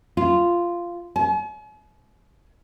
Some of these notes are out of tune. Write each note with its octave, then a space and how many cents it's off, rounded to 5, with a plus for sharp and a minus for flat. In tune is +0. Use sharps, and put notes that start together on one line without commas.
F4 -10
G#5 +45